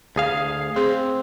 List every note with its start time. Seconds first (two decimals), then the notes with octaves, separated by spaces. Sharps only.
0.16 D2 G#4 F5
0.76 C4 G#4